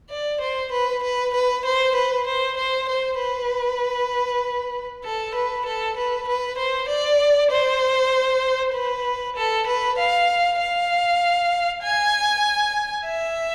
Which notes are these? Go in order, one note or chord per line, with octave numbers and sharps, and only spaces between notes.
D5
C5
B4
B4
B4
C5
B4
C5
C5
C5
B4
A4
B4
A4
B4
B4
C5
D5
C5
B4
A4
B4
F5
F5
G#5
E5